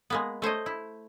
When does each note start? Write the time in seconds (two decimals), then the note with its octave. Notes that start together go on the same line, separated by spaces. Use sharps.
0.10 G#3 A#3 B3
0.42 A3 C5 C#5 D#5
0.66 E4